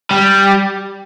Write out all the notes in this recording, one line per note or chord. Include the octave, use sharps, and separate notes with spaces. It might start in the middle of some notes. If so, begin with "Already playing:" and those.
G3